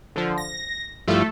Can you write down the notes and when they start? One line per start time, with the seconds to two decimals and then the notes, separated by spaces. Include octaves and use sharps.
0.16 D3 F3
0.38 A#6
1.08 G2 F3 A3 E4 A4